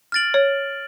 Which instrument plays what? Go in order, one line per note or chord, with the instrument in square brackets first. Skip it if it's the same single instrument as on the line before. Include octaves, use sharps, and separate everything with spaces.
[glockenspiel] F6 A6 D7 F#7
[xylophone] C#5